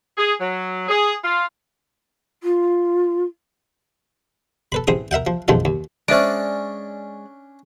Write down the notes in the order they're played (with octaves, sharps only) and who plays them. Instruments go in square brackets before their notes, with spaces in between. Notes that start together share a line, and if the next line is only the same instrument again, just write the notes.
[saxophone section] G#4
F#3
G#4
F4
[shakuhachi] F4
[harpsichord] A4 B4 B5
A1 C4 G#4 D#6
A#4 E5 F#5 G5
F3
B1 F#2 D#3 F3 G#3 A4
D#2
[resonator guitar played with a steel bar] G#3 D5 [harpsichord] C#4 D4 [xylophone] C5 E5 D7